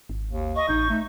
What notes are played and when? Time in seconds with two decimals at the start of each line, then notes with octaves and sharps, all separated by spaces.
0.09 G#1
0.31 D#2
0.56 D#5 C#6
0.69 A1 D#4 G6
0.90 A3